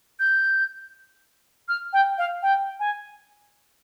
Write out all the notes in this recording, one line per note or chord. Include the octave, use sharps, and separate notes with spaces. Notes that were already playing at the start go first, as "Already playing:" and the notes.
G6
F6
G5
F5
G5
G#5